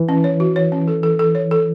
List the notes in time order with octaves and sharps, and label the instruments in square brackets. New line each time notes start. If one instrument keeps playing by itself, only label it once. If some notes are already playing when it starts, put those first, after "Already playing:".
Already playing: [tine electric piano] E3
[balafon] C#4
C#5
F#4
C#5
C#4
A4
A4
A4
C#5
A4